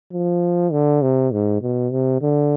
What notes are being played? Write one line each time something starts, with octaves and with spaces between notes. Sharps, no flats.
F3
D3
C3
G#2
B2
C3
D3